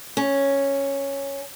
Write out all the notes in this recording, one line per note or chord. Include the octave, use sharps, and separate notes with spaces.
C#4